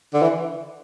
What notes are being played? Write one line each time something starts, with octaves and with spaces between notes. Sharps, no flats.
D3
E3